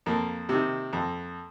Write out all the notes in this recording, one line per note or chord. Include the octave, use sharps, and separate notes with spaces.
F2 A#3
C3 D#3
F2